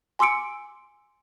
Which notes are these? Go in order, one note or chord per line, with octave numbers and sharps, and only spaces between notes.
G#5 C6 D6 E6 C#7 D7